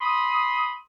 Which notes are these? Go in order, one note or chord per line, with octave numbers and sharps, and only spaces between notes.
B5 C6 D#6